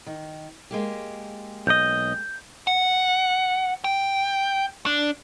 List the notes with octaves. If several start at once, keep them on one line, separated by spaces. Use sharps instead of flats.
D#3
G#3 A#3 G4
B1 D#5 G6
F#5
G5
D4